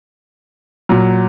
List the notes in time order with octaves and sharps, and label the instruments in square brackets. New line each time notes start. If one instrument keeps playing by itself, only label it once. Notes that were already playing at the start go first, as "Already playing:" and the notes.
[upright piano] A#2 F#3